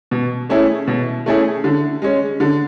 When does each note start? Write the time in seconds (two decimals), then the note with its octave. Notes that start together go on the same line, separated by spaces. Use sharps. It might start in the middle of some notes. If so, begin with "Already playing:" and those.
0.11 B2
0.49 A3 C#4 E4 G#4
0.87 B2
1.26 A3 C#4 E4 G#4
1.64 D3
2.02 G#3 C#4
2.40 D3